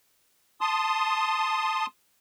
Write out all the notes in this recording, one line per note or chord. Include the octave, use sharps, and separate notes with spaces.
A5 C6 D#6